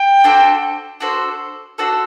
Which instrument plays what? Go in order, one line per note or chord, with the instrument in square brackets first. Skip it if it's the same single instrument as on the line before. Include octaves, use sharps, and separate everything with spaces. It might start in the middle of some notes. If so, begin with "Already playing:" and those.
Already playing: [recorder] G5
[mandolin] D4 F#4 A4 C5
D4 F#4 A4 C5
D4 F#4 A4 C5